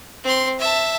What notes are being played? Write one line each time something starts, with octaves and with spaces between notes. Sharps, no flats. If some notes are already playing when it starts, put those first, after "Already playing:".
C4 C6
E5 A5